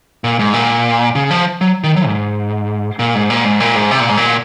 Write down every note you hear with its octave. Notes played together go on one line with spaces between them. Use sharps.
A#2
G#2
A#2
C#3
F3
F#3
D#3
F#3
G#2
A#2
G#2
A#2
G#2
A#2
G#2
C3
A#2
G#2
A#2